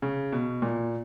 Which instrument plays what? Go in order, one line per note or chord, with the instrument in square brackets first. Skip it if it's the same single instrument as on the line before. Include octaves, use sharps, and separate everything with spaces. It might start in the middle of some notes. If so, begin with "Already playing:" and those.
[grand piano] C#3
B2
A#2